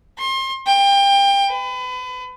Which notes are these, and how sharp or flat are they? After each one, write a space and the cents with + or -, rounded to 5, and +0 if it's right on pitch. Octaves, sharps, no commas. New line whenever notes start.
C6 +30
G5 +25
B4 +35